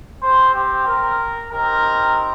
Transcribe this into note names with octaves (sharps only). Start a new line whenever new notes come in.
C4 G4 C5
G4
A#4
C4 D#4 G4 A#4